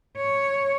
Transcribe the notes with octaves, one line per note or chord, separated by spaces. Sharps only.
C#5